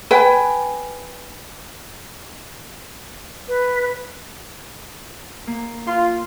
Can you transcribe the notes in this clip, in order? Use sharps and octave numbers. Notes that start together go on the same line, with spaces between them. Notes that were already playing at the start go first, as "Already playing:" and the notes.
B4 G5 G#5
B4
A#3
F4 C6